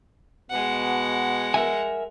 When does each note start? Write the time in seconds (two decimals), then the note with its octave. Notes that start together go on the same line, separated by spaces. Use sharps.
0.50 B2 G#3 F#5
1.54 A#4 E5 G#5